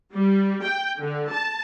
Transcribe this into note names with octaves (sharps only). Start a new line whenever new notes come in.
G3
G5
D3
A5